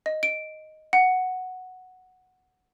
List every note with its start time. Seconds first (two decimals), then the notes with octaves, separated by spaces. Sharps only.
0.06 D#5
0.23 D7
0.93 F#5